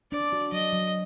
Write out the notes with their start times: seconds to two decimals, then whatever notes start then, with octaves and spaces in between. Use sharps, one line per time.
0.12 D4 D5
0.33 F#4
0.52 F#3 D#5
0.72 F#3